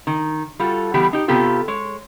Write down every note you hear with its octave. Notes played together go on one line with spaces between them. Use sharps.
D#3
G3 F4 F#4 A4
E3 G3 B3 G4
D#4 G4
C3 B3 F4 G4 A4
G#3 C#5